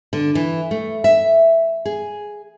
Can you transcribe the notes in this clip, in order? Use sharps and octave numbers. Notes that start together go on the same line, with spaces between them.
D3
E3
A3
E5
G#4